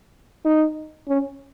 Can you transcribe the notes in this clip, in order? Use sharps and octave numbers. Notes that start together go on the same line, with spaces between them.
D#4
C#4